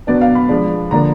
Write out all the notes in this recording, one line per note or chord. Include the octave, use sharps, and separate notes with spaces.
B2 F#3 B3 D4 D5
F5
B5
F3 G#3 D4
D3 F3 A#3 D4 A#5